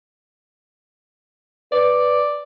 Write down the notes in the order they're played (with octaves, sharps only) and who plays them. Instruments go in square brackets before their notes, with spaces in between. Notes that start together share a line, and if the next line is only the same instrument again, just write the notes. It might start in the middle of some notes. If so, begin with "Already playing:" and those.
[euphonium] B4 [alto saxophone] D5